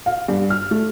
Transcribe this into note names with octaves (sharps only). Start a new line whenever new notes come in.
F5
G2
F6
A3